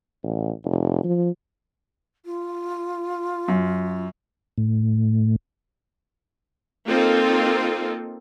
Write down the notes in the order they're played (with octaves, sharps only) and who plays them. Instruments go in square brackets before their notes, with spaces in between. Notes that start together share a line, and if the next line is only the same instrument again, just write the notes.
[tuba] A1
F1
F3
[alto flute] F4
[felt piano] F#2
[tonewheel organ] A2
[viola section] A#3 C4 D#4 F4 A4